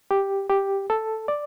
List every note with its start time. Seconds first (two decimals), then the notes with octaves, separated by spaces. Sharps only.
0.11 G4
0.49 G4
0.90 A4
1.28 D5